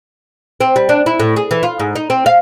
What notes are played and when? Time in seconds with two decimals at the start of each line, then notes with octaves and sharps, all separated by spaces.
0.61 C4
0.76 G3
0.89 D4
1.06 E4
1.20 A2
1.36 G#4
1.51 E3
1.63 F4
1.80 G#2
1.95 D#4
2.10 C4
2.26 F5